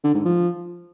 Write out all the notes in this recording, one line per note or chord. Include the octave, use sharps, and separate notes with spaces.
D3
G#2
F3